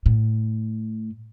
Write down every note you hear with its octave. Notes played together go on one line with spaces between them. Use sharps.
A2